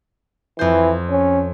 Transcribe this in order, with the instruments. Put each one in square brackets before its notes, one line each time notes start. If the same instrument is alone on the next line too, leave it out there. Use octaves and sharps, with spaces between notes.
[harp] F2 C5 [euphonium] E3
[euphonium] C#4